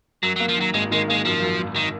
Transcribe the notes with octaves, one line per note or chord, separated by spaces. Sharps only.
F#2 F#3
F#3 A#3
F3
D#3 F#3
G#1 G#3
D#3 G#3
G#3 A#3
F#2 F3
F#2
G#1
D#3